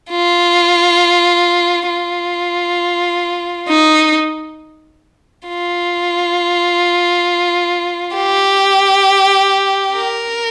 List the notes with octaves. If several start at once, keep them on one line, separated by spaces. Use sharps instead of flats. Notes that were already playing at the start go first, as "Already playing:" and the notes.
F4
F4
D#4
F4
G4
A#4